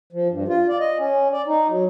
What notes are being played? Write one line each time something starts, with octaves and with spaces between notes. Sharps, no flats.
F3
G2
F4
D5
D#5
C#4
D5
D#4
F#3